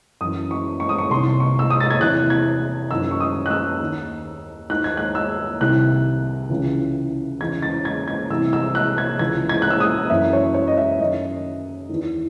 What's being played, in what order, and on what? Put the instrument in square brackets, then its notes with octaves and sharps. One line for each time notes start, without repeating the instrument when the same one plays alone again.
[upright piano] F#2 E3 D#6
C#6
C#6
D#6
C#6
C2 C3 D#3 C6
C#6
E6
D#6
A6
G#6
E2 C3 E3 F#6
G#6
F#2 D#3 E6
C#6
D#6
F#6
E6
D#2 D#3
D#2 D#3 F#6
G#6
F#6
E6
C2 C3 D#3 F#6
C#2 C#3 E3
E2 C#3 E3 G#6
A6
G#6
G#6
C2 C3 E3 E6
E6
F#6
G#6
C#2 C#3 E3 G#6
G#6
F#6
E6
D#6
F#2 E3 E5
C#5
C#5
D#5
E5
F#2 D#3 D#5
E2 D#3